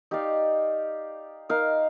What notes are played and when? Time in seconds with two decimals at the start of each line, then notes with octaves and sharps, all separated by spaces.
0.11 D#4 G4 D5 F5
1.49 D#4 A#4 F5